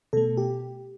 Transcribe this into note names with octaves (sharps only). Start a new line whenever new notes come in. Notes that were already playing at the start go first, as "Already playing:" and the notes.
B2 A3 A4
G4